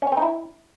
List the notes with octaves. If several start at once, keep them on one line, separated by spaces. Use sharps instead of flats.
C#4
C#5
C4
D#4
E4